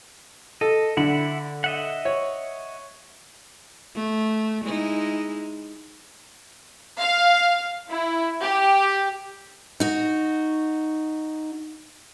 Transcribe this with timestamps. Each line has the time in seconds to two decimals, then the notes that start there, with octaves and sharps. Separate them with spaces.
0.61 A4 D#5
0.97 D3 E4 F#5 B5
1.64 D#5 E5 F#5
2.05 C#5
3.95 A3
4.64 G#3 D#4 E4
6.99 F5
7.89 E4
8.41 G4
9.80 D#4 F#4